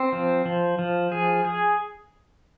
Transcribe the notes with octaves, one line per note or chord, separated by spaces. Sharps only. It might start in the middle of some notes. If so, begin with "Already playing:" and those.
Already playing: C4
F3
F3
F3
G#4
G#4